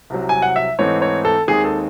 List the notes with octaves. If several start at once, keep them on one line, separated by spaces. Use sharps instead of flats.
C2 C3 F#3
G#5
F#5
E5
G#2 E3 A3 C4 D#4 C#5
C#5
A4
D#2 D#3 G#3 C4 G#4
A4